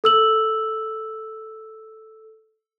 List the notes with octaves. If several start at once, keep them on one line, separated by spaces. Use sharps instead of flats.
A4 E6 F#7